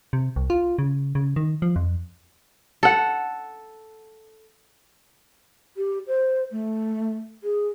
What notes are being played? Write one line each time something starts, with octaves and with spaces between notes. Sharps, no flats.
C3
C2
F4
C#3
C#3
D#3
F3
F2
A4 F#5
G4
C5
A3
G#4